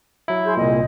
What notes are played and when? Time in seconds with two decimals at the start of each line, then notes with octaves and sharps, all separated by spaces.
0.28 F#3 E4
0.45 G#4 C6 G6
0.57 C2 A#2 D#5